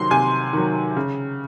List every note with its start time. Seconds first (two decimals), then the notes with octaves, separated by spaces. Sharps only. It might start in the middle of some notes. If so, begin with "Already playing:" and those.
Already playing: C3 D#3 F#3 C6
0.11 C3 G#5
0.53 D#3 F#3
0.96 C#3